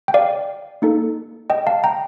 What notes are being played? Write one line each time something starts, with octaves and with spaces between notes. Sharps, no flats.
G5
D5 F5
A#3 D#4 A4
D#5 G5
F5 A5
G5 A#5